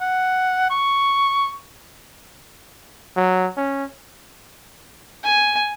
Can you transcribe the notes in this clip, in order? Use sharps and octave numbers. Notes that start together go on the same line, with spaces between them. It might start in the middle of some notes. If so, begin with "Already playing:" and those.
F#5
C#6
F#3
C#4
G#5